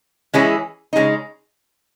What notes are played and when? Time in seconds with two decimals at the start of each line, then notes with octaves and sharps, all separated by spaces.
0.34 E3 G#3 C#4 E4 G#4
0.93 C#3 G#3 D#4